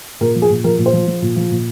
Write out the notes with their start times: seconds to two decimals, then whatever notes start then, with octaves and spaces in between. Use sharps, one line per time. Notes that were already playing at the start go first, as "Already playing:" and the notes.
0.21 A#2 A#4
0.35 F3
0.42 G#4
0.50 A#2
0.64 F3 A#4
0.78 A#2
0.86 C5
0.93 F3
1.07 F3
1.22 A#2
1.36 F3
1.50 A#2